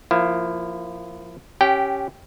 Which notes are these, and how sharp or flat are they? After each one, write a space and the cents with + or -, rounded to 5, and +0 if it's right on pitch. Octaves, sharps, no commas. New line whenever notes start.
F3 +0 A#3 +0 E4 +20
C#4 +0 G4 +0 G5 -20